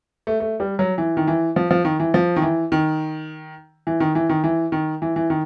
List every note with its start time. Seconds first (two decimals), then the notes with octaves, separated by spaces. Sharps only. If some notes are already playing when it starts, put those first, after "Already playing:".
0.27 A3
0.40 A3
0.60 G3
0.79 F#3
0.98 E3
1.17 D#3
1.27 E3
1.56 F3
1.71 F3
1.85 D#3
2.00 E3
2.14 F3
2.36 D#3
2.42 E3
2.72 D#3
3.87 E3
4.00 D#3
4.15 E3
4.29 D#3
4.44 E3
4.72 D#3
5.02 E3
5.16 E3
5.30 D#3